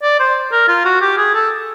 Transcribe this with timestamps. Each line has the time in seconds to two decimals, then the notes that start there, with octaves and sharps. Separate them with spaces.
0.03 D5
0.20 C5
0.52 A#4
0.69 F4
0.85 F#4
1.02 G4
1.18 G#4
1.35 A4